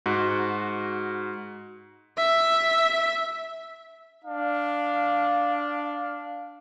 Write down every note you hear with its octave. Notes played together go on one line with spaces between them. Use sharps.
G#2 F#4
E5
D4 F5